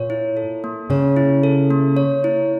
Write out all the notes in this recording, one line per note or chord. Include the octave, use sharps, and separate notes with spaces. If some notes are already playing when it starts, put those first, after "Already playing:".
Already playing: A#2 C#5
E4
A4
A#3
C#3 C#5
E4
A4
A#3
C#5
E4